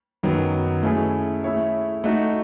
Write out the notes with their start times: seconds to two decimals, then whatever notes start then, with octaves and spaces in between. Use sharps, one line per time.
0.23 F#2 D#3 F#3 B3
0.83 A3 C#4 E4 G#4
1.44 A3 E4 G#4 C#5 E5
2.04 A3 D#4 F#4